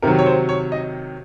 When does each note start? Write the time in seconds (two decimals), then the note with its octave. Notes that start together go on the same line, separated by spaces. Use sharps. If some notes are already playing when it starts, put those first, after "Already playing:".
0.02 C3 D#3 F#3 A#4
0.19 C#5
0.26 C5
0.49 C#5
0.72 D#5